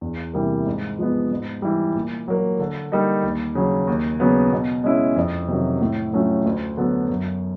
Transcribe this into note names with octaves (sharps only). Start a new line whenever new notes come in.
E2
C3 E3 G3 A#3
G#2
F3 G#3 B3
G#2
E3 G3
A#2
F#3 A#3
D3
G3 A#3 D#4
D#2
C#3 F#3
D#2
C#3 F#3 B3
B2
G#3 C#4 E4
F2
C3 D#3 F#3
A2
F#3 A3 C#4 F4
D2
D3 F#3 B3
F#2